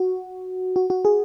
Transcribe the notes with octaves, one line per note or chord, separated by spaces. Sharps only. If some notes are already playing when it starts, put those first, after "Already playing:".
Already playing: F#4
F#4
F#4
G#4